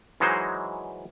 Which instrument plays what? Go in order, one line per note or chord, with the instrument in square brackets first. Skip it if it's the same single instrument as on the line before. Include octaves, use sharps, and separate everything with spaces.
[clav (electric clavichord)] E3 F#3 G#3 D#4 C5